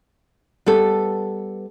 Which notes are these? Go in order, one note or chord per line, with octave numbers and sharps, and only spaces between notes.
G3 B3 A4